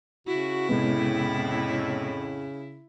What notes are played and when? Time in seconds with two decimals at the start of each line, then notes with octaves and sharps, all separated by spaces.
0.27 C#3 E4 F#4
0.69 F2 A2 C3 G#3 B3